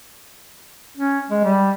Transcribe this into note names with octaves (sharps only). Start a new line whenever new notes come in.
C#4
G#3
G3